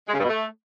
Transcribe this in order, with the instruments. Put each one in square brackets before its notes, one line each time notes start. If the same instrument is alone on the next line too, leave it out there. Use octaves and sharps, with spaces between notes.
[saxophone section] G#3
C#3
G2
B2
A3